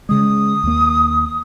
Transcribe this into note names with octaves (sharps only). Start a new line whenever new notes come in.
C#3 G#3 D#6
D#2 A#3